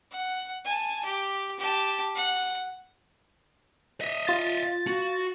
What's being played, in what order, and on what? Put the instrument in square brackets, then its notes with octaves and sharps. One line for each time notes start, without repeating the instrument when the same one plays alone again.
[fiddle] F#5
G#5 A5
G4
G4 A5
F#5
[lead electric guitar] D#5 E5
[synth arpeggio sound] F4 A6
[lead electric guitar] F#4